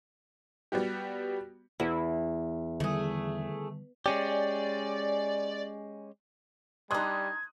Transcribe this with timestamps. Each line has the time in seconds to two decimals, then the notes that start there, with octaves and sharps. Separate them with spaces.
0.72 G3 B3 F#4 G4
1.80 E2 E4
2.80 D3 D#3 G3 A3 G#4
4.06 G#3 C#4 G4 D5
6.91 G3 D4 D#4 C6 D#6 F#6 G#6